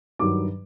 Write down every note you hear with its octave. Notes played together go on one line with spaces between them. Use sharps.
G2 D#3 F#3 D6